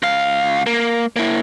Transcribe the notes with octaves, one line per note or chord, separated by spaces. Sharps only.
C#2 F5
A#3
A#3 E4